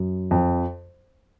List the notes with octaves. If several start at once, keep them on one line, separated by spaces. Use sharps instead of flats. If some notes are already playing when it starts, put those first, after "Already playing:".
Already playing: F#2
F2